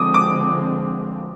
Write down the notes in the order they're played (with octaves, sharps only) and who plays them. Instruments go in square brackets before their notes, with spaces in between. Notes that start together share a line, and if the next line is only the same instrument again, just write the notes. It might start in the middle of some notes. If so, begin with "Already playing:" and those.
Already playing: [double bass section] D3 F3 G#3 C4 [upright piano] D6 D#6
[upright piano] D6